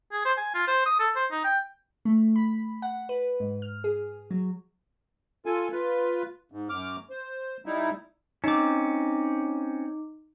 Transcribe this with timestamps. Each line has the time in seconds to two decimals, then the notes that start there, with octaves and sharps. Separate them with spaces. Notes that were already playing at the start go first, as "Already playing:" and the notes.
0.12 G#4
0.25 C5
0.37 G#5
0.55 F4
0.68 C5
0.86 D#6
0.99 A4
1.16 C5
1.32 D#4
1.44 G5
2.05 A3
2.36 B5
2.82 F#5
3.09 B4
3.40 G#2
3.62 F6
3.84 G#4
4.31 F#3
5.46 F4 A4 G#5
5.72 F4 B4
6.52 G#2
6.69 F#2 D6 F6
7.10 C5
7.66 G3 D#4 E4
8.44 C4 C#4 D#4 D6